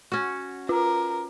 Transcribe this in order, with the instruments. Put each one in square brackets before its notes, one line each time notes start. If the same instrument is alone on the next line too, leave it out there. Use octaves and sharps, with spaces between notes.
[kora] C#4 F#4
[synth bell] F4 [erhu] A#4